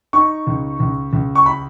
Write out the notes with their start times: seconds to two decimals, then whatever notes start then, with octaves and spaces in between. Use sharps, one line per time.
0.13 D#4 C#6
0.47 C#2
0.80 C#2
1.13 C#2
1.35 C#6
1.46 B5